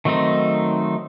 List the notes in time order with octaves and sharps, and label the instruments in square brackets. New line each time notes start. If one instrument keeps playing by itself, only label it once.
[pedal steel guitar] D#3 F#3 A3 C4 D#4